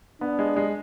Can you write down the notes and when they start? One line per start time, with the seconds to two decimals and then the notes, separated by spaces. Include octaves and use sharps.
0.21 B3 D4
0.39 G#3
0.56 G#3